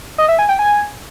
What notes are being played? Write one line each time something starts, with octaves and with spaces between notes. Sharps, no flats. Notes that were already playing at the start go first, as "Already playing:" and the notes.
D#5
E5
G#5
G5
G#5